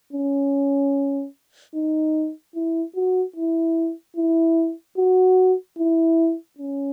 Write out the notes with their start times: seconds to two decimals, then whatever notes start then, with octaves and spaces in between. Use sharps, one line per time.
0.13 C#4
1.75 D#4
2.55 E4
2.96 F#4
3.36 E4
4.16 E4
4.98 F#4
5.79 E4
6.59 C#4